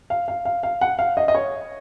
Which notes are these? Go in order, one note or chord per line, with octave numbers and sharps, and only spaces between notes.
F5
F5
F5
F5
F#5
F5
D#5
D#5
C#5